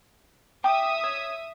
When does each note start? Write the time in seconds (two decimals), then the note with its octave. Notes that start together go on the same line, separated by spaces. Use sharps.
0.64 E5 G5 D6 D#6
1.04 C#5